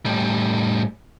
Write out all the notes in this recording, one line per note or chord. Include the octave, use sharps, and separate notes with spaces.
A2 G3